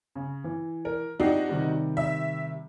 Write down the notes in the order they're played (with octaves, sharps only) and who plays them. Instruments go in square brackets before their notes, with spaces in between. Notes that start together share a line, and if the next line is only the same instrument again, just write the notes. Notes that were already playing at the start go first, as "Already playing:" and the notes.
[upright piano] C#3
E3
[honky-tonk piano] A#4
[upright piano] F2 G4 C7 [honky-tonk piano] D4 D#4 F#4
[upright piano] C3 D#3 G3
[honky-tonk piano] E5